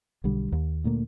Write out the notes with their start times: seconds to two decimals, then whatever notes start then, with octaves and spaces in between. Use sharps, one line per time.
0.24 B1 D3 G3
0.52 D#2
0.84 D2 A#2 A3 A#3